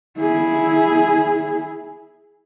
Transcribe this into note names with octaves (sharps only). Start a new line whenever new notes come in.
E4 G#4